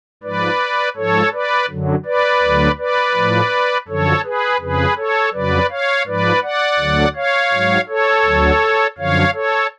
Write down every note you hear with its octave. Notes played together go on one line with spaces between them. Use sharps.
G#2 F3 B4 D5
G#2 F3 A4 C#5
B4 D5
F#2 D3 F#3
B4 D5
D2 D3 F#3
B4 D5
A2 F3
F#2 D3 F3 A4 C#5
G#4 B4
F2 C#3 F3 G#4 B4
A4 C#5
F2 C#3 F#3 B4 D5
C#5 F5
G#2 F3 B4 D5
D5 F#5
D2 D3 F#3
C#5 F5
G#2 F#3
A4 C#5
D2 D3 F#3
F#2 D3 F3 C#5 F5
A4 C#5